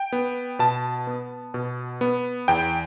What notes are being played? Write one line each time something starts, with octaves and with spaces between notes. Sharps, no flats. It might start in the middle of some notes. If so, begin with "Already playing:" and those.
Already playing: G5
B3
B2 A5
B3
B2
B3
E2 G5